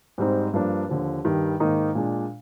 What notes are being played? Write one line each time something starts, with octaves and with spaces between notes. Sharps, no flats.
G#2 G3 C4 D#4
G2 F3 A#3 D4
D#2 D3 F3
G2 D#3 G3
G#2 D#3 A#3 D#4
A#2 G#3 D4